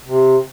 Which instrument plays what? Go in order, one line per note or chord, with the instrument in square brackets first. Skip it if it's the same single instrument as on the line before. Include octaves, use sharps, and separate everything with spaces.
[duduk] C3